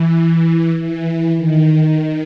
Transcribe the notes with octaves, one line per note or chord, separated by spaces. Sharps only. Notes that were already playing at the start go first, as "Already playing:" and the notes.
Already playing: E3
E3
D#3